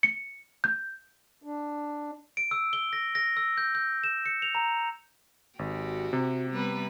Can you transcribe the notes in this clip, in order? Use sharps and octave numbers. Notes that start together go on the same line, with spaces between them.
C#7
G6
D4
D7
E6
G7
A#6
A#6
E6
G6
G6
E7
C#7
F7
A#5
G#1 F#4 G4
C3
G3 B3 B4